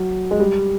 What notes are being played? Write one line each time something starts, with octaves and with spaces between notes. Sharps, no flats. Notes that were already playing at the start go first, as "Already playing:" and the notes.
Already playing: F#3
G#3
G3